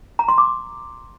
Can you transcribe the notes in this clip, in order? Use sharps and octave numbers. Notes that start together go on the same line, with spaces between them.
A#5
C6
D6